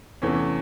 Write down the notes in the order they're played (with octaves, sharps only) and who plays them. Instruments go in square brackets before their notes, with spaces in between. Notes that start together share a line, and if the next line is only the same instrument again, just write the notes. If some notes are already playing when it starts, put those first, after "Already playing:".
[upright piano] E2 C3 E3 A3 C#4